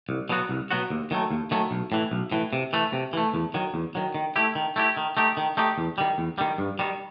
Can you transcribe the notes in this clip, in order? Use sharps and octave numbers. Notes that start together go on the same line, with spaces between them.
C2
B2 F#3 B3 F#4
C2
B2 F#3 B3 F#4
D#2
D#3 F#3 A3
D#2
D#3 F#3 A3
B1
A2 E3
B1
A2 E3
C3
E3 A3
C3
E3 A3
E2
D#3 F#3
E2
D#3 F#3
D#3
A3 E4 G4
D#3
A3 E4 G4
D#3
A3 D#4 G4
D#3
A3 D#4 G4
E2
D#3 G3
E2
D#3 G3
G2
D#3 G3